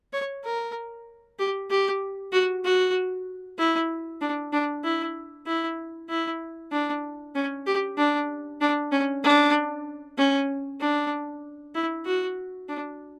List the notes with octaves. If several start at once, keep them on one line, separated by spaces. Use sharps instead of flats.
C#5
A#4
G4
G4
F#4
F#4
E4
D4
D4
E4
E4
E4
D4
C#4
G4
D4
D4
C#4
D4
C#4
D4
E4
F#4
D4